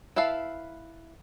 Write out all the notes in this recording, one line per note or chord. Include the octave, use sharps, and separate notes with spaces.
E4 B4 E5 F5 A5